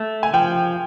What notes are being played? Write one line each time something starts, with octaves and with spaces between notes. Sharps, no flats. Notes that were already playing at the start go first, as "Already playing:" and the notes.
Already playing: A3
G#5
F3 G5